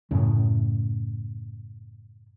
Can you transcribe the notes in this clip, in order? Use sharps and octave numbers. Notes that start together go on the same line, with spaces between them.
F#2 A2 C#3